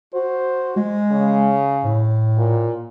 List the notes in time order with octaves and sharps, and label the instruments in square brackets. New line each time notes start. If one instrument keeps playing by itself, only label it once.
[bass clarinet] F#4 [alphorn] C5
[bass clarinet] G#3
[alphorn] C#3
[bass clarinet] A2
[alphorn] A#2